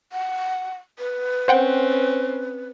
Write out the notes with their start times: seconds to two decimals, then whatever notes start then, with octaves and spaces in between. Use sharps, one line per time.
0.12 F#5
0.99 B4
1.48 C4 C#4 C5 F#5 G5